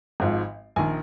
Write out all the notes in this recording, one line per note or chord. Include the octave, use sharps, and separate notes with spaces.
G#1 G#2 F3
A#1 D#3 G#5